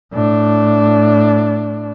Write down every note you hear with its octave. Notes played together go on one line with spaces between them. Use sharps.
A2 D4